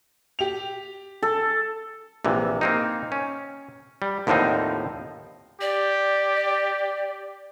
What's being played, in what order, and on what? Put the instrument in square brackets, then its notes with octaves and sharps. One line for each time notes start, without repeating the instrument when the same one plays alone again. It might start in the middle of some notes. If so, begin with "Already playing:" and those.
[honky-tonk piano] G4 F7
[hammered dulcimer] A4
[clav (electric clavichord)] A#1 C3 E3
A#3 C4 D#4
C#4
G3
D#2 A2 D3 F3 C4 D#4
[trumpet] G4 [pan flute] D5